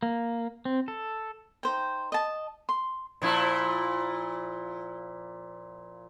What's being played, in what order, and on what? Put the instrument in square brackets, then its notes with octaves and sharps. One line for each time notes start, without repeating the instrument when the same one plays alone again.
[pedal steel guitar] A#3
C4
A4
[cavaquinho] D#4 C5 G5
D#5 A5
C6
[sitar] A#2 F3 E4